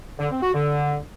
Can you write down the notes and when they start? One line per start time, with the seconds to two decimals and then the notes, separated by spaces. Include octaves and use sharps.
0.19 D3
0.31 C4
0.42 F#4
0.54 D3